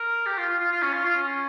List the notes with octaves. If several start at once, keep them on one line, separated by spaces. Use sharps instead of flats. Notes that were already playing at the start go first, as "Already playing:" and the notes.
Already playing: A#4
G4
F4
F4
F4
F4
C#4
F4
F4
C#4